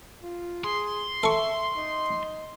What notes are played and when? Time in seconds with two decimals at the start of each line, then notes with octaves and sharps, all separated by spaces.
0.23 F4
0.64 G#4 C6
1.23 A4 E5 C#6
1.77 D#4